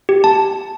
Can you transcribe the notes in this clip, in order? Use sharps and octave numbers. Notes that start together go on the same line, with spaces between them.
G4
A5